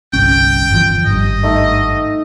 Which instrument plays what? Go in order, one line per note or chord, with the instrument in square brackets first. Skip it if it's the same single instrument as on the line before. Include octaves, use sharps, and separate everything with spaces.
[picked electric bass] G1 C2 C#4 [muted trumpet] G5
[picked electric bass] G1 E2 F3
[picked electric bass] G#1 G2 [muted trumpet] D#5
[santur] A3 D#4 F#5